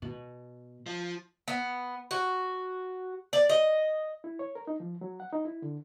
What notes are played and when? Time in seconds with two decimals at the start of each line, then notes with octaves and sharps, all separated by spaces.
0.02 B2
0.86 F3
1.48 B3
2.11 F#4
3.33 D5
3.49 D#5
4.24 E4
4.39 C#5
4.55 A#4
4.67 D#4
4.80 F3
5.01 F#3
5.20 F#5
5.32 D#4
5.45 E4
5.62 D3